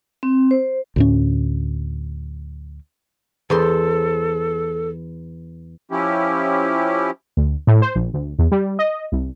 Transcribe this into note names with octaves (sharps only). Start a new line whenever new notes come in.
C4
C5
D2 A2 C#4
E2 A4 C5 C6
F3 C#4 E4 G4
D2
A2
C5
A#1
D2
E2
G3
D#5
C2